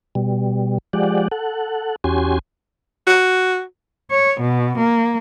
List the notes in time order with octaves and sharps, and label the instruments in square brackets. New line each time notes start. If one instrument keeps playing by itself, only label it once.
[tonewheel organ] B2 G3
F3 G#3 G4 D5 F#5
A4 F#5
E2 C#4 F#4 G4 G#5 C6
[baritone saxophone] F#4
[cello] C#5
B2
A#3